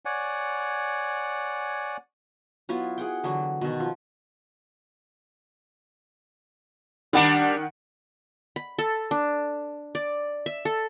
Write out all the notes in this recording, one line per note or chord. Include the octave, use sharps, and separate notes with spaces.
C#5 D5 F#5 G#5
F#3 B3 E4 F4
G#4 F#5 G5
D3 E3 F#3
B2 D#3
F3
D#3 G3 D4 F#5 C#7
B5
A4
D4
D5
E5
A4